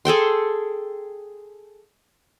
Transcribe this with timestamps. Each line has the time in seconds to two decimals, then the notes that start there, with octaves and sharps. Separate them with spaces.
0.05 G#4 A4 G5 C6